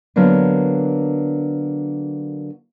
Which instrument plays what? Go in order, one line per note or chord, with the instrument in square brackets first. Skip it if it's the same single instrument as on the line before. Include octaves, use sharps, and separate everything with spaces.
[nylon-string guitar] D3 F#3 A#3 B3 D4